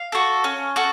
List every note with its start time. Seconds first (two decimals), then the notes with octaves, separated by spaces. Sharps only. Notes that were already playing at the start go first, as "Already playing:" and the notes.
Already playing: F5
0.12 F#4 A4
0.44 C#4
0.76 F#4 A4